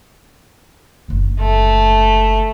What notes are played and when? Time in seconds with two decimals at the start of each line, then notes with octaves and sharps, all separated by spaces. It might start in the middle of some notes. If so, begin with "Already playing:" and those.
1.08 F#1 D3
1.40 A3